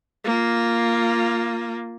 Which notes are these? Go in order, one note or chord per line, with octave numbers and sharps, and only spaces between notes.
A#3 F4